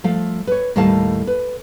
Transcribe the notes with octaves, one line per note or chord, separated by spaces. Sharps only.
F3 A3 F5
B4 C#5
D#2 A2 G3 A3 F5 A5
B4